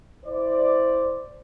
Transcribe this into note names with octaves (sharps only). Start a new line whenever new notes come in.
E4 C5 D5